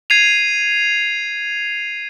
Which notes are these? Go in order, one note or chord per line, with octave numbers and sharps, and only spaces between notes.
G#6 C7 D#7 F7